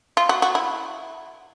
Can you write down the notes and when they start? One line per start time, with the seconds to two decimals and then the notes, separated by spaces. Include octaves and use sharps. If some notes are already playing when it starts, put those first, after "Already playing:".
0.17 F4
0.29 F#4
0.42 F#4
0.55 E4